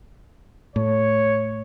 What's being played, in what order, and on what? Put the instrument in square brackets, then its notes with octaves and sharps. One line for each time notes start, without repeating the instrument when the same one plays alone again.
[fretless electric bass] A2 [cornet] C#5